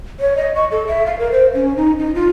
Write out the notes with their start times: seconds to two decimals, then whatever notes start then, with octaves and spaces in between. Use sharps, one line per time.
0.20 C#5
0.37 D#5
0.55 C#6
0.71 A4
0.87 E5
1.06 F5
1.19 A#4
1.32 C5
1.54 C#4
1.77 D#4
1.99 D#4
2.15 F4